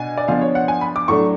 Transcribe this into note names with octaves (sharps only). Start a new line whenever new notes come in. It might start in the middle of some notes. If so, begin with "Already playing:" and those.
Already playing: B2 B3 D4 G#5
D5
F3 B3 D4 F5
C#5
F#5
G#5
B5
D6
A2 F#3 A3 D4 C#6